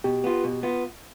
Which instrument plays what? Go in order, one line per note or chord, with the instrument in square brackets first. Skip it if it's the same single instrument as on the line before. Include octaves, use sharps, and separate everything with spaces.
[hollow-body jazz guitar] B2 [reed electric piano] G4
[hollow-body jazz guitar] B3 F4
B2
B3 F4